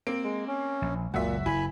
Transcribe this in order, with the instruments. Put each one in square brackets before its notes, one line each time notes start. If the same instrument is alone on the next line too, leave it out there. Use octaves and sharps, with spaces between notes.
[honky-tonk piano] A#3 C4 D7
[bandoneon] G#3
C#4
[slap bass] A#1
[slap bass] F#1 C#2 [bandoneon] A#2 [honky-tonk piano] F#4 E5
[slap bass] F#1 [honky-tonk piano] E4 [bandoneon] G#5 B5